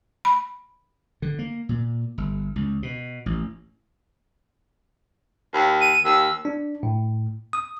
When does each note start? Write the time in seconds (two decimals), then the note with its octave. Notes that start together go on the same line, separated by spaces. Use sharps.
0.25 B5
1.22 D3
1.39 A#3
1.69 A#2
2.18 G1
2.56 C#2
2.83 B2
3.26 A1
5.53 D#2
5.81 D#7
6.04 D#2 E6
6.45 D4
6.83 A2
7.53 D#6